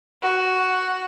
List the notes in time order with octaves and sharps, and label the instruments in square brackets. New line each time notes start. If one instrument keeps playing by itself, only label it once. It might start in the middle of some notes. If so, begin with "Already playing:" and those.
[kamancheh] F#4